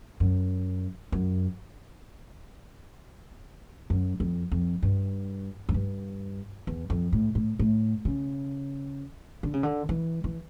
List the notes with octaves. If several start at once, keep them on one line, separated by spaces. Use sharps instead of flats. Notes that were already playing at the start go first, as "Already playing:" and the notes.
F#2
F#2
F#2
F2
F2
G2
F#2
G2
E2
F2
A2
A2
A2
C#3
D3
C#3
D3
E3
E3